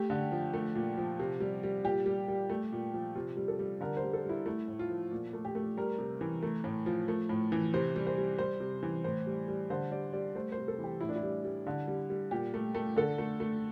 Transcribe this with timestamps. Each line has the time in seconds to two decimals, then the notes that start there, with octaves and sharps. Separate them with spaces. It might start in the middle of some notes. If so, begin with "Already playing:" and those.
Already playing: A3 G4
0.10 D3
0.32 F3
0.54 A3
0.75 A#2
0.97 F3
1.19 C3
1.40 G3
1.63 G3
1.84 A#2 G4
2.06 G3
2.28 G3
2.50 A3
2.72 A#2
2.94 F3
3.15 C3 F4
3.37 G3
3.48 A4
3.59 G3
3.81 D3 A#4
3.97 C5
4.03 G3
4.13 A4
4.25 G3 E4
4.46 A3 E4
4.68 A2
4.79 F4
4.90 F3
5.11 A#2
5.33 A3
5.45 G4
5.55 A3
5.77 G3 A#4
5.99 C3
6.21 E3
6.43 A3
6.64 A2
6.86 F3
7.08 A3
7.29 A2
7.52 E3
7.74 C3 C5
7.96 G3
8.07 C5
8.18 G3
8.39 G3 C5
8.60 C3
8.83 E3
9.04 A2 C5
9.27 G3
9.48 G3
9.70 D3 C5
9.91 G3 D5
10.13 G3 D5
10.35 A3 C5
10.52 C5
10.57 C3
10.68 A4
10.78 E3
10.84 G4
11.01 A2 E4
11.09 D4
11.16 E4
11.23 G3
11.45 G3
11.67 D3
11.87 G3
12.10 G3
12.31 A#2 G4
12.54 A3
12.75 A3
12.96 D3 A4
13.18 A3
13.40 A3